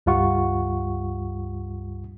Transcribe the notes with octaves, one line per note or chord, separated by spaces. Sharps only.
C#2 G2 G3 F4 F#5 C#6